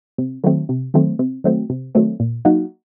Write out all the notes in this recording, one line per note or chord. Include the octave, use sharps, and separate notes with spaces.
C3
D#3 F#3 A3 C4
C3
D#3 F#3 A3 C4
C3
D#3 F#3 A3 C4
C3
D#3 F#3 A3 C4
A#2
F#3 A#3 D#4 F#4